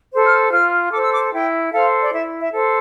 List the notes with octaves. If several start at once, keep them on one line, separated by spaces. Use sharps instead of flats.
A4 C5
F6
F4 F6
A4 C5 D6
E6
D6
E4 G5
A4 C5 F5
D5
E4 E5
E5
A4 C5